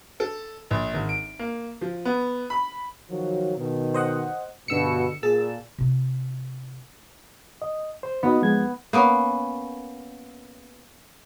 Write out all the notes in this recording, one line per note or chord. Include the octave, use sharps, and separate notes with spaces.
A4
A#1
G#1
D7
A#3
F3
B3
B5
D#3 F3 F#3
B2 D#3
C5 D#5 F#5
G2 B2 D3 E6 C#7
A#2 G#4 A5 E6
C3 F4
D#5
C5
B3 D#4 F#4 D#5
F3 G#3 G#6
A#3 B3 C#4